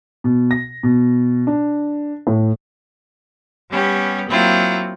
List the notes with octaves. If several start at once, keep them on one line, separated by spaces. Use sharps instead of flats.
B2
A#6
B2
D4
A2
G3 B3 C#4 G4
F#3 A#3 C4 E4 F4